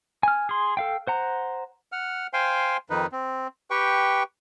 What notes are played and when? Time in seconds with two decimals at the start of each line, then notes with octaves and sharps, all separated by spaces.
0.23 G#5 F6
0.49 G#4 C6
0.77 A4 F5 G5
1.07 C5 F#5 A#5
1.92 F#5 F6
2.33 C5 F5 G5 G#5 C6
2.90 F2 D#3 D#4 B4
3.12 C4
3.71 G4 B4 G5 C#6